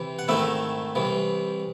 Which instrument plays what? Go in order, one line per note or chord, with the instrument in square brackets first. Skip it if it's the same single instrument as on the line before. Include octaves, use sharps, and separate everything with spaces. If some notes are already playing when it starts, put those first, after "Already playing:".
Already playing: [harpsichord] C3 E3
F#5
G#2 D#3 A3 C4 E4 E5
C2 C3 E3